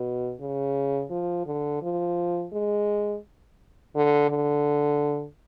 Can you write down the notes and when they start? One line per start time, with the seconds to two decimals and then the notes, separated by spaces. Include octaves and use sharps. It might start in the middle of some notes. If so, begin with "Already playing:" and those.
Already playing: B2
0.40 C#3
1.11 F3
1.46 D3
1.82 F3
2.53 G#3
3.95 D3
4.30 D3